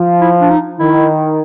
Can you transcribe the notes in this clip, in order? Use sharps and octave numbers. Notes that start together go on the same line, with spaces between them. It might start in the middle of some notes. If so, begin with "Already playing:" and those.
Already playing: F3
E4
D4
D#4
D#3 E4